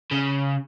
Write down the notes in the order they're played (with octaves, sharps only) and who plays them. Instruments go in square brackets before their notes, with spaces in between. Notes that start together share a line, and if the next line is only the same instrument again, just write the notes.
[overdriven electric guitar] C#3